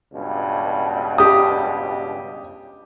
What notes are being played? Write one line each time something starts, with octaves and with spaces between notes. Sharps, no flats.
C#2 G2 B2
G4 D#6